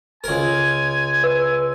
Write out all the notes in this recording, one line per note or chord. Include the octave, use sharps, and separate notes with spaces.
C#2 A#4 G#5
B4 E6